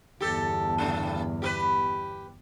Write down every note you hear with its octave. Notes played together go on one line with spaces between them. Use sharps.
G1 E2 G4 A4
G2 C#3 A3
G4 A#4 B4